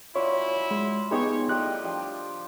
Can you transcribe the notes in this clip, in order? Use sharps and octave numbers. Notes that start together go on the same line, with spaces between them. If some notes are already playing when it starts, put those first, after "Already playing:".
F#3 C#4 E4 F4 C#5 D5
G#3 C6
B3 D#4 F4 G4 G#4 C#5 C6
A2 G3 D#4 F4 G4 D#5 F#6
F3 D4 G4